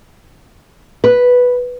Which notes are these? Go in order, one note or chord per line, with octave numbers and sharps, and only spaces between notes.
B4